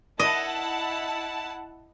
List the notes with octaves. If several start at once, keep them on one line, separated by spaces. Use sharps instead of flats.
E4 D#5 F#5 A5